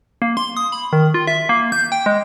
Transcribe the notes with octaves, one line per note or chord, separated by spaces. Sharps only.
A#3
C6
D#6
B5
D#3
F4
E5
A#3
G6
G5
G#3